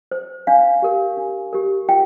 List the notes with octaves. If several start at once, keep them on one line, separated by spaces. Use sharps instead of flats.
C5
D4 F5
G4 A#4
D4
G4 A#4
F4 G5